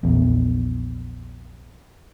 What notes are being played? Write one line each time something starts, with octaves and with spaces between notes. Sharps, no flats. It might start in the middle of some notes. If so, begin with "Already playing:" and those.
A#1 E2